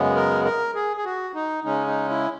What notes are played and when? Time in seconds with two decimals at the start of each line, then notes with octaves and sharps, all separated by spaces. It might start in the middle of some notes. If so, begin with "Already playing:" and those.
Already playing: F#2 C#3 G#3 B3
0.15 A#4
0.45 A#4
0.75 G#4
0.97 G#4
1.05 F#4
1.34 D#4
1.64 C#3 G#3 C#4 D#4
1.87 D#4
2.09 E4